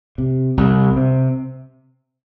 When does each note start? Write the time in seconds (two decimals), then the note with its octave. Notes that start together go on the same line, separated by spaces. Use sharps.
0.18 C3
0.57 C2
0.96 C3